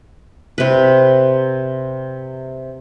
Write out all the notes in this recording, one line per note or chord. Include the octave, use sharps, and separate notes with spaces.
C3 B4